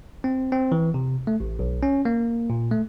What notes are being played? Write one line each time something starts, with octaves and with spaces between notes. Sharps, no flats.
C4
C4
E3
C3
A3
A1
B1
C#4
A#3
A#2
A3